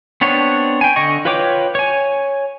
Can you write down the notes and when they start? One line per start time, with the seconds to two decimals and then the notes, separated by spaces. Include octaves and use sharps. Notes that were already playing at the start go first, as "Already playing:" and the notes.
0.21 B3 C4 D4 C#5
0.81 G5 G#5
0.96 D3 D#5 C#6
1.25 F4 B4 C#5 G5 D6
1.75 C#5 G#5